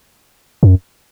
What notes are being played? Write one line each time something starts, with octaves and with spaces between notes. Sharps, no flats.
F#2